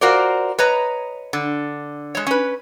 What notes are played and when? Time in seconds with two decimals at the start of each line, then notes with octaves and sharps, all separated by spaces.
0.01 F4 F#4 A#4 C5 D5
0.59 B4 C#5 D#5 A#5
1.33 D3
2.15 G#3 C#5
2.27 C#4 B4